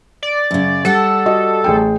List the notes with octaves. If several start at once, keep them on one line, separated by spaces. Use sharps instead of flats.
D5
F#2 C#3
G3 A4 F#5 A5
F#4 D#5
A1 G#4 G5